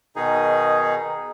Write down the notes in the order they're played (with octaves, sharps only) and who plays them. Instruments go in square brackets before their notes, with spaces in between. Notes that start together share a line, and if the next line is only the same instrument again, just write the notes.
[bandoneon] B2 D#3 D#4 G#4